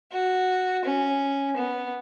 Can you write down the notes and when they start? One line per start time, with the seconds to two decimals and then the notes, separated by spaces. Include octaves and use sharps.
0.13 F#4
0.85 C#4
1.57 B3